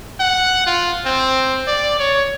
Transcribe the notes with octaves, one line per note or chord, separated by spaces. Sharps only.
F#5
F4
C4
D5
C#5